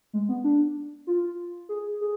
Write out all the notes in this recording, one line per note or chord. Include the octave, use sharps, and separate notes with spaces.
G#3
B3
D4
F4
G#4
G#4